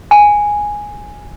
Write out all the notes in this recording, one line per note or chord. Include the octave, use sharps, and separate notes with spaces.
G#5